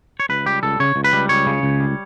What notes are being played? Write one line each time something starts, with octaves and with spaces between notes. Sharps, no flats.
C#5
C#2 B4
G3 G4
C#2 A4
C#3 C#5
C#2
B4
G3
C#2 C#5
C#3
C#2
G3